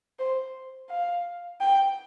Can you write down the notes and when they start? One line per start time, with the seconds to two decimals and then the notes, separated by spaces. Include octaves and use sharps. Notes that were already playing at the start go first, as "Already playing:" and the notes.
0.19 C5
0.90 F5
1.61 G5